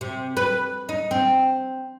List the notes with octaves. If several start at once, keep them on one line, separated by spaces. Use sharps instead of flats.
C3
B4
D#4
C4